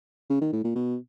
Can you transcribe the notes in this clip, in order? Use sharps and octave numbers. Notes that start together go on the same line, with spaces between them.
C#3
D#3
A2
A#2
B2